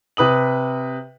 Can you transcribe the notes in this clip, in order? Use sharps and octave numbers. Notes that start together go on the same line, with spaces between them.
C3 B4 D#6 F#7